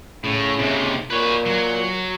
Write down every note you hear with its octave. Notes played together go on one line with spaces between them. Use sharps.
A2 C#3
D#2 C3
A#2 B4 C#5
F#3